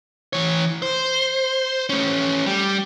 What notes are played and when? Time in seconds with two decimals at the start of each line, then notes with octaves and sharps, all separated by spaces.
0.33 E3 C#5
0.82 C5
1.90 A3 C#4
2.46 G3